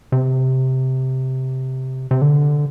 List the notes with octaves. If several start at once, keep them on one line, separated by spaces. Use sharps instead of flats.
C3
C3
D3